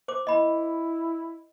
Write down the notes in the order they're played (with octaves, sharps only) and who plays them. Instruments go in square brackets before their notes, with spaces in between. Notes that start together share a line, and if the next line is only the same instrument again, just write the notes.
[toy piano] C5 D6
[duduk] E4 [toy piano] D#5 B5